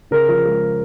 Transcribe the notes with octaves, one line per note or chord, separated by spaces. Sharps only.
C#3 A#4
F3
G#3